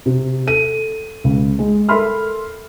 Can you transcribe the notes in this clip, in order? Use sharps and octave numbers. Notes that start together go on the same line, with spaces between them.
C3
A4 D#7
C#2
G#3
A4 A#4 E5 B5 C6 F6